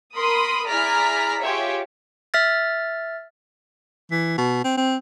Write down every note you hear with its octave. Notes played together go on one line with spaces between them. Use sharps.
A#4 B5 C6 D#6
E4 G#4 D5 A#5 F6 B6
F4 G4 G#4 C#5 E5
E5 F6 A6
E3
B2
C4
C4